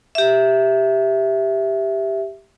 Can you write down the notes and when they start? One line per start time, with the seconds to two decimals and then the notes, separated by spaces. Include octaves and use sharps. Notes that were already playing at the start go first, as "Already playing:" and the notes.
0.15 G4 E5